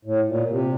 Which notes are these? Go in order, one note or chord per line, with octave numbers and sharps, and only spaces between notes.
A2
A#2
C3